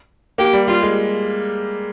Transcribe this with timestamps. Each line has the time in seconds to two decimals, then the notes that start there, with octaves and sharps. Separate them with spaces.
0.38 A#3 G4
0.53 G3
0.68 G3 F4
0.82 G#3